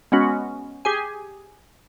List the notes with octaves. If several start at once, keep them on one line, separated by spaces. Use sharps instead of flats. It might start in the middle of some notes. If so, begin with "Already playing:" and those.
G#3 B3 C#4 F#4
G4 G#4 G#5